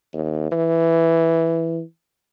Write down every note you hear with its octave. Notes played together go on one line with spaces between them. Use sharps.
D#2
E3